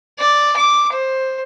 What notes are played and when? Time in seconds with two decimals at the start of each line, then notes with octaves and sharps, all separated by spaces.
0.19 D5
0.56 D6
0.93 C5